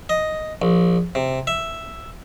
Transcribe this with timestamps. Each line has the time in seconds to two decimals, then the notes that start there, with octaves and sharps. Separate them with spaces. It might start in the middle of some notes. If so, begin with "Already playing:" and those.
0.09 D#5
0.62 A#1
1.15 C3
1.47 E5